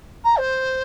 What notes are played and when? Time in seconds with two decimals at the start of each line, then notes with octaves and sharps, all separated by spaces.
0.24 A#5
0.38 C5